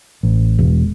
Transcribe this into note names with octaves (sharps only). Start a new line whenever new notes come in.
A1
E1